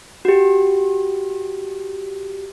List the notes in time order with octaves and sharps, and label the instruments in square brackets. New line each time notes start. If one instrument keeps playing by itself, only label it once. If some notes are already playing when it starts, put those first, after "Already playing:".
[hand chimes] F#4 G4